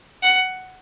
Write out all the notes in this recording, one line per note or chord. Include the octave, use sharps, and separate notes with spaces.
F#5